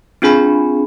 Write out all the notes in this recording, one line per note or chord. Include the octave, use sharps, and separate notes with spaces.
C4 D4 F4 G#4 G#5 B5